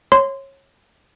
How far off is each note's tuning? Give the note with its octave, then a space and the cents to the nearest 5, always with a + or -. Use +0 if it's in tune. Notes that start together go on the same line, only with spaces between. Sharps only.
C#5 -25 C6 -15